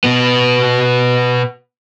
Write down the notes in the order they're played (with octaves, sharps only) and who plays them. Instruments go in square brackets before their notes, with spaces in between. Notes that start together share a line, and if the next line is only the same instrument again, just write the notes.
[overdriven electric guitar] B2 B3